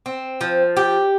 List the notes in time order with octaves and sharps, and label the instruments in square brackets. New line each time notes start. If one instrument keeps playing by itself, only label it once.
[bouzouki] C4
F3
G4